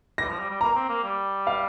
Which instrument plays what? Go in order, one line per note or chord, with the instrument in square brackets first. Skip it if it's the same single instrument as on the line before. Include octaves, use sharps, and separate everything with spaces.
[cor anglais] G3 [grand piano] A#6
[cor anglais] F3
G3
G3
[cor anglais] A#3 [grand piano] A#5
[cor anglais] C4
A#3
G3
[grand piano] F5